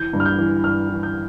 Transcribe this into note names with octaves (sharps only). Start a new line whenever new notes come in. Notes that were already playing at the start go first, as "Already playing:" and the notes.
Already playing: E3 G6
G2
F6
G6
E3
G2 F6
E3
G6